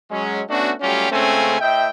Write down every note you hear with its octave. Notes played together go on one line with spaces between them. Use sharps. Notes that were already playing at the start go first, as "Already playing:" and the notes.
F#3 G#3 C#4
A3 B3 C#4 D4 F#4
F#3 G3 A3 C#4 F4 G4
C#2 C#3 A3 C4 C#4 G#5
A2 D#5 E5 G5